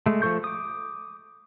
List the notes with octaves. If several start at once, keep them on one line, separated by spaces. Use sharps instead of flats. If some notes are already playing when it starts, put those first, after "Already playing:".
G#3 A3
F3 A3 A4 C#6 G6
D6 D#6